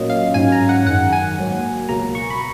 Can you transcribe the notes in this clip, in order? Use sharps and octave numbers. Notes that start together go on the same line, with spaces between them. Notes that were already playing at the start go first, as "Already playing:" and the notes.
Already playing: A#2 F#3 A#3 C#4 F4 D#5
F5
G#2 F#3 C#4 G#5
A#5
F#5
F#2 D#3 G#3 F#5
G#5
G#2 F#3 A#3
C#2 B2 F#3 A#3 A#5
C#6
B5